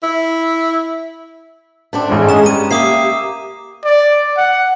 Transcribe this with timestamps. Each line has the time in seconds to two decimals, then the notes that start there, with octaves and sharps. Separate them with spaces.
0.03 E4
1.93 A3 C4 D4
2.09 A1 E2 G#3
2.29 C#4 A#5 E7
2.46 G2 G4 D#7
2.71 A#3 E5 D6 D#6 C7
3.85 D5
4.38 F#5